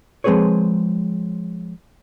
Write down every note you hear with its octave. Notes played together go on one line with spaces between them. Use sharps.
F3 G#3 C4 G#4 B4 C#5